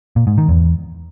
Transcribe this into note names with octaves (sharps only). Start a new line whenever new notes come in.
A#2
G#2
D#3
E2